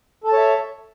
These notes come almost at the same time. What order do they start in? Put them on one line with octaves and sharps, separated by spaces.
A4 A5 C#5 E5